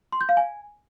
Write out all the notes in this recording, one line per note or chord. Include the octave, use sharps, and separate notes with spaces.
C6
G6
F5
G#5